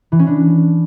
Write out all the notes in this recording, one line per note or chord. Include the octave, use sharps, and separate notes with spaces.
E3
C#4
D4